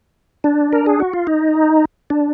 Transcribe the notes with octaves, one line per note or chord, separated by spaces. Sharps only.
D4
A#4
G#4
F#4
F4
D#4
D4